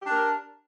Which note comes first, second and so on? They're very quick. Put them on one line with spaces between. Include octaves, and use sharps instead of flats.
G4 D4 A#4